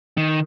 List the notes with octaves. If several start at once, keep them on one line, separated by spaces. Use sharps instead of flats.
D#3